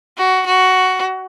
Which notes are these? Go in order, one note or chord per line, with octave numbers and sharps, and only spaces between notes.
F#4
F#4